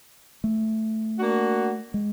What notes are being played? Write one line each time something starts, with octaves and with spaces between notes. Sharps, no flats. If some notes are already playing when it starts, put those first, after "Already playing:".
A3
A#3 D4 F#4
G#3